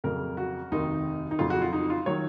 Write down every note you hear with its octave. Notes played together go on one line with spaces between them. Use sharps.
F2 C#3 F#3 A#4
F#4
F1 D#2 D#3 D#4
D#4
F2 C#3 F#3 F4
F#4
F4
D#4
F4
D#3 F#3 C#5